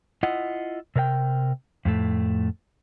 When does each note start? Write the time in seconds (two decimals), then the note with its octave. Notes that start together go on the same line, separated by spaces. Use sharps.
0.23 E4 F4 D#5 F#5
0.96 C3 A#4 C#5 G5
1.85 F2 A2 A3